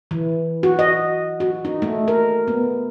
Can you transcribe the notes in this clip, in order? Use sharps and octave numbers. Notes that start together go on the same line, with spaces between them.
E3
F#4
D#5
F#4
D#4
A3
A#4
B3